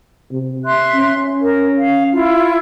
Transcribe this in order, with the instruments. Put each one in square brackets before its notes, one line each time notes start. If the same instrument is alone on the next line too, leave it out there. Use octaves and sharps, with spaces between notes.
[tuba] C3
[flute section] E5 C6 F#6
[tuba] C#4
[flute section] A#4
F5
E4 F4